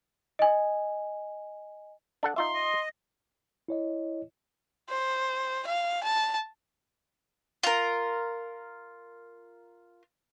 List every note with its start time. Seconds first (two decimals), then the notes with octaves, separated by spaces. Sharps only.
0.39 D#5 G#5
2.23 D4 A4 F#5
2.36 D#4 F4 E5 C6
2.54 D#5
3.68 E4 C#5 D#5
4.89 C5
5.67 F5
6.03 A5
7.63 F4 A#4